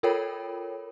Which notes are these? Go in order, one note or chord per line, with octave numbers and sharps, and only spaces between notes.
F4 A4 A#4 C#5 G5 B5